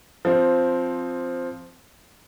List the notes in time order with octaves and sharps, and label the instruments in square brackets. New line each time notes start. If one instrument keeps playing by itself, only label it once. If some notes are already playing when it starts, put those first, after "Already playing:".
[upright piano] F3 C4